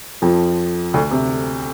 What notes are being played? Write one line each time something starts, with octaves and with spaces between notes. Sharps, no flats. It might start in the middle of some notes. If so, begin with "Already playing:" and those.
F2 F3
D2 D3
C3